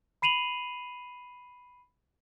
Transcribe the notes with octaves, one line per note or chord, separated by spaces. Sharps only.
B5 C7 D#7 F7 F#7